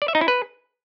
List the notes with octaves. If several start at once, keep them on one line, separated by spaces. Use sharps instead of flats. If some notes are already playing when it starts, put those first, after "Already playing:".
D5
E5
D#4
E4
B4